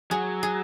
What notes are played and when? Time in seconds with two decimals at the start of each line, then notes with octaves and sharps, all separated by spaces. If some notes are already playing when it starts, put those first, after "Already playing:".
0.11 F#3 G#4
0.43 G#4